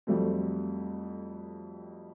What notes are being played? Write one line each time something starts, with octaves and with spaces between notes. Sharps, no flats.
F2 F#3 G3 A3 C4